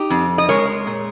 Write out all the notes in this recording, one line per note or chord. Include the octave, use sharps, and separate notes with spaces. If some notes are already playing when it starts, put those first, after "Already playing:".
Already playing: D#4 G4
F2
D#5
G#3 A#4 C#5
A#2